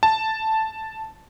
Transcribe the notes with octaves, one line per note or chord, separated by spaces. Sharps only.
A5